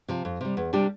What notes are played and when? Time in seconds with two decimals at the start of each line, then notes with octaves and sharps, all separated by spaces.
0.08 C3 F3
0.25 F2
0.41 C3 G3
0.57 E2
0.73 C3 G3 D4 G4